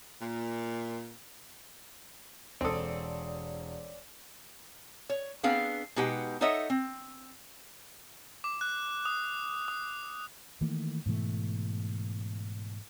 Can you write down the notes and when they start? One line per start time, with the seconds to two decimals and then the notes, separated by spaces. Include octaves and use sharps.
0.22 A#2
2.61 E1 C4 A4 C#5 D5 G#5 D#6
5.09 C#5
5.43 B3 C4 D4 G#4 B4 F5
5.96 B2 G#3 D#4 G4 B4 F#5
6.41 D#4 A4 C#5 D#5 E5 F#5
6.70 C4
8.44 D6
8.61 F#6
9.05 D#6
9.68 D#6
10.61 D#3 E3 A3 A#3
11.06 G#2 B2 E3 A3